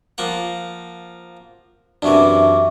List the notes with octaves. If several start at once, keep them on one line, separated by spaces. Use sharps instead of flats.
F3 A#3 F#5
F#2 C3 E3 D4 E5 C#6 D6